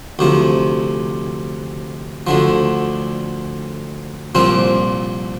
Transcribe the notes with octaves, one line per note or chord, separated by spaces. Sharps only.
D2 C3 F3
D2 D3 F3
C2 A#2 F3 C4